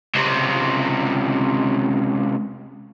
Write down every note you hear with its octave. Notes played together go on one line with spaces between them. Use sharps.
C#2 C3